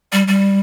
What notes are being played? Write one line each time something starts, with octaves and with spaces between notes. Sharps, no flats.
G3
G3